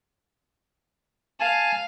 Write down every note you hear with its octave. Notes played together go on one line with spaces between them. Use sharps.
F5 G#5 A5